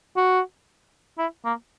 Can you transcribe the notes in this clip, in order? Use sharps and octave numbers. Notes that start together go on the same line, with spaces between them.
F#4
E4
A#3